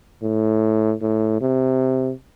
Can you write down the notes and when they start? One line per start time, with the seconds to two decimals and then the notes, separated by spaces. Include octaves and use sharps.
0.23 A2
1.01 A2
1.41 C3